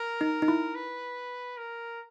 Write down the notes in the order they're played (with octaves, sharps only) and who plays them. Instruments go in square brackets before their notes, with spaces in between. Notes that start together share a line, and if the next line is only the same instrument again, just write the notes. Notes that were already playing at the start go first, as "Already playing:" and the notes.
Already playing: [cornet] A#4
[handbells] D#4
D#4
E4
[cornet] B4
A#4